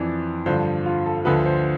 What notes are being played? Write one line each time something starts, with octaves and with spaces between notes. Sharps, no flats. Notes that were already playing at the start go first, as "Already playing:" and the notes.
Already playing: F2 E3 D5
G2 D3 F3 C5
F4
A4
D2 D3 F3 B4
C5